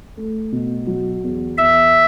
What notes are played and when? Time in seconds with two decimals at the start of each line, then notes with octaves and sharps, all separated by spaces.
0.17 A3
0.52 B2
0.87 F#3
1.24 E2
1.58 E2 E5